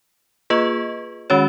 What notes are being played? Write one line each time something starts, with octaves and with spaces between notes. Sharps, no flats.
A#3 F4 G#4 B4 D#5
D#3 G#3 C#4 F#4 C#5